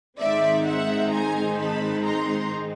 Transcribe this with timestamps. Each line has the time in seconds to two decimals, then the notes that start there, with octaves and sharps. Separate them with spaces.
0.20 G#2 D#3 G#3 C4 D#4 D5 E5
0.66 E5 F#5
1.13 G#5 A#5
1.59 A5 B5
2.05 A#5 C6